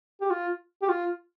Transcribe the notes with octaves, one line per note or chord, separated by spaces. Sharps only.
G4
F4
G4
F4